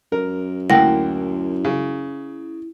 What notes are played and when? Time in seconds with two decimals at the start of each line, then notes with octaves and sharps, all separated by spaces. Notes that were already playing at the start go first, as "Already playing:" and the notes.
0.12 F#2 A#4
0.70 D2 A#3 E4 F#5 G5 A#6
1.65 C#3